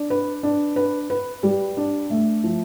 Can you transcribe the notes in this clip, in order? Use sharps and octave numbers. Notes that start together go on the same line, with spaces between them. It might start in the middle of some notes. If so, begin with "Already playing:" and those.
Already playing: D4
B4
D4
B4
B4
G3
D4
A3
F3